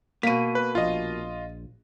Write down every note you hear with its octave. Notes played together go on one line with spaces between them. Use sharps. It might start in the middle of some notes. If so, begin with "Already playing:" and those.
B2 A#3 B6 D#7
B4
A#1 F4 D#5